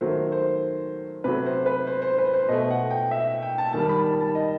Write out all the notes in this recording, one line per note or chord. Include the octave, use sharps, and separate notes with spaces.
D#3 F#3 A3 C5
C5
C3 F#3 A3 B4
C5
B4
C5
C5
B4
C5
B2 A3 D#5
F#5
G5
E5
G5
A5
D#3 G3 A5
B5
A5
A5
D#5